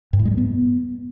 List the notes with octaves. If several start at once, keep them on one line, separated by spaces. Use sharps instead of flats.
G2
A2
G#3
G3
B3